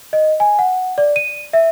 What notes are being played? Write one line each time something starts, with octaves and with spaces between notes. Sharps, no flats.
D#5
G#5
F#5
D5
D#7
E5